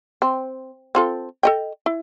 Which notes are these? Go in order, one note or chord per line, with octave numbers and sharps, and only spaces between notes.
C4
C4 F4 A4
A4 D#5 G5
E4